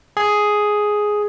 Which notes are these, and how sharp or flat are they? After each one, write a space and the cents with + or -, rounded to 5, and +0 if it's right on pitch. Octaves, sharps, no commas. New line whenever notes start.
G#4 +5